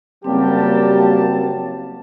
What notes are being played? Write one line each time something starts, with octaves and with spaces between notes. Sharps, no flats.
F#1 F#3 G3 A#3 C4 G4 A5